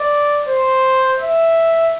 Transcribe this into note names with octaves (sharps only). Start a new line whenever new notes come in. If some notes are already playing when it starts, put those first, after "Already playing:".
Already playing: D5
C5
E5